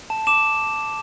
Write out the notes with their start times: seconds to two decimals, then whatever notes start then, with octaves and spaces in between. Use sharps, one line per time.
0.10 A5
0.27 D6 E7